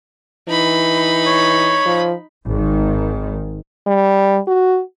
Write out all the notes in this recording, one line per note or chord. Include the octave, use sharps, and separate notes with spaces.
E3 D#4 B5
C#5
F3
G#1 D#3
G3
F#4